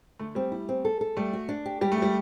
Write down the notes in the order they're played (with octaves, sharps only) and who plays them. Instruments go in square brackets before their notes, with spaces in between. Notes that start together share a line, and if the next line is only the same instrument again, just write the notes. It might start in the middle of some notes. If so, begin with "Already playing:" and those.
[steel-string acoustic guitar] D3 [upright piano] A3
[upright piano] G3 [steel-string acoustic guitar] C4
[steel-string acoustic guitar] E4
C4
A4
A4
[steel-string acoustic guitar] G3 [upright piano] A3
[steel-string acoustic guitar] F#4
D4
G4
[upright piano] G3 [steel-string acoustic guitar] G4
[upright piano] A3
[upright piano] G3 [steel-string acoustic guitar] G4